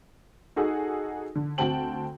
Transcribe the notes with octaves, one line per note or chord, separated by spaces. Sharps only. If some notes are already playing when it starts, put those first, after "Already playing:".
D#4 F#4 G#4 A4
D3
D2 C4 F#4 G5 A5 F#7